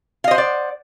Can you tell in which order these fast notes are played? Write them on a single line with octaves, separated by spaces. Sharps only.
F5 D#5 C5 F#5 D5